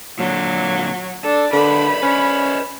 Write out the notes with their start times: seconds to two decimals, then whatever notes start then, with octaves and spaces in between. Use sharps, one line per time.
0.19 A#2 D3 F#3
1.24 D4 A4
1.53 D3 A#4 B4 D5 B5
2.03 C#4 B4 C5 D5